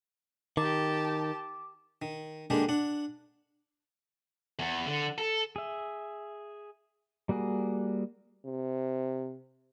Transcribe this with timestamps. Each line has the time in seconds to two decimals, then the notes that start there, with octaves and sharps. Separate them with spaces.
0.57 D#3 G4 A5 D6
2.02 D#3
2.50 D3 D#3 G#3 A#3 D4 G4
2.69 D4 F#5
4.59 E2
4.86 D3
5.18 A4
5.56 G#4 E5
7.29 G3 A#3 F#4 G#4
8.46 C3